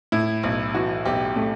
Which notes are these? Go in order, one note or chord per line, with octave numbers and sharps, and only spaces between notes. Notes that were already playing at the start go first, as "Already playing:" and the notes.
A2 E4
B1
E3 F#4
B1 G4
A2 A3